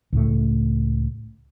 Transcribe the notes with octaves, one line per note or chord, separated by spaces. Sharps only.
C#2 A2 A3